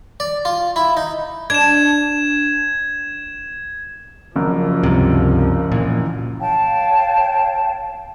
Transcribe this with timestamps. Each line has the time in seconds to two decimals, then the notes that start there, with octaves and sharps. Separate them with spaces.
0.20 D5
0.45 F4
0.76 E4
0.97 D#4
1.50 D4 G#6 E7
4.36 F#1 F#2 F3
4.83 C#2 G2 C3
5.72 A#2 E3
6.40 C#5 F5 G5 A5